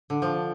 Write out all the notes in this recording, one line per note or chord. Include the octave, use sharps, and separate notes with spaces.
D3
F3